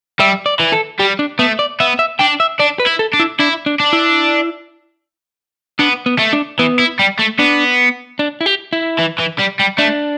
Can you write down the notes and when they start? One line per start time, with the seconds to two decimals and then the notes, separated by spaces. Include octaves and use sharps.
0.19 G3 E5
0.46 D5
0.60 E3
0.72 A4
0.99 G3 G4
1.19 D4
1.39 A3 B3
1.59 D5
1.80 B3 E5
1.99 E5
2.19 D4 G5
2.40 E5
2.60 D4 D5
2.79 B4
2.86 E4
2.99 A4
3.13 D4
3.20 E4
3.39 D4 E4
3.66 D4
3.80 D4
3.93 E4
5.79 B3 D4
6.06 B3
6.19 A3
6.33 D4
6.59 E3 B3
6.79 E4
6.99 G3
7.19 A3
7.39 B3 D4
8.19 D4
8.41 E4
8.46 G4
8.73 E4
8.99 E3
9.19 E3
9.39 G3
9.59 G3
9.78 A3 D4